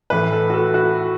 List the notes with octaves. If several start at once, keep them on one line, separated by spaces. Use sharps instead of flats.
A2 E3 B4
A4
F#4
A4
F#4